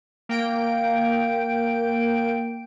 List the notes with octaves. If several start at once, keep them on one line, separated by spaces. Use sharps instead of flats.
A#3 G5 D7